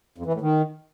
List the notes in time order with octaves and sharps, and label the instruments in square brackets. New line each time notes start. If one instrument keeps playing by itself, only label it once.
[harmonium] F2
E3
A2
D#3